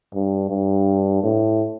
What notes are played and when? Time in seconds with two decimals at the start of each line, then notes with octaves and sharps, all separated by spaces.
0.15 G2
0.50 G2
1.23 A2